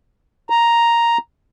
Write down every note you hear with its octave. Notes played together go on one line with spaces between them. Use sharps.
A#5